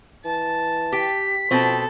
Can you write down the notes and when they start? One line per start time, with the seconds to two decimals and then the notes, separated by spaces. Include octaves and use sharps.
0.25 E3 A5
0.92 G4 B6
1.51 B2 F3 C4 A4